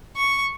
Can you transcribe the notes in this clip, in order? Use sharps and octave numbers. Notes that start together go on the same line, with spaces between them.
C#6